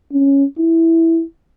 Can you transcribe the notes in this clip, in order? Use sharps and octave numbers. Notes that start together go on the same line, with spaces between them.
C#4
E4